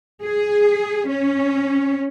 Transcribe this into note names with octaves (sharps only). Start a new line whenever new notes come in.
G#4
C#4